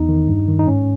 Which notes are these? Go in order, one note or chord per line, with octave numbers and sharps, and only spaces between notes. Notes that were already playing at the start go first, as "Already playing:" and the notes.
Already playing: E2 D#4
D#3
G2
D#3
D#4
G#2 C#4